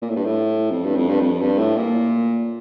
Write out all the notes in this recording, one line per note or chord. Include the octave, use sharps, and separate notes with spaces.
A#2
A2
G2
A2
F2
G2
F2
G2
F2
G2
A2
A#2